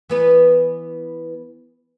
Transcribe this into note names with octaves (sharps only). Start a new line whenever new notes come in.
E3 B3 B4